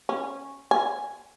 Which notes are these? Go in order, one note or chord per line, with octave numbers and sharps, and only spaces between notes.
C#4
G#5